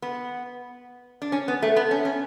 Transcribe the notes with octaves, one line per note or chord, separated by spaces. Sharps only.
B3
D4
C#4
B3
A3
B3
C#4
C#4